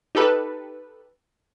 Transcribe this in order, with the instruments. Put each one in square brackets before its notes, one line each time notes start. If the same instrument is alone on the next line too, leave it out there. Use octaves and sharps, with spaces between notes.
[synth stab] D#4 G4 A4 B4